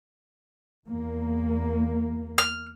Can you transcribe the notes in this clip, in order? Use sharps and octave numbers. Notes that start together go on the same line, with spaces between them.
E2 A#3
F6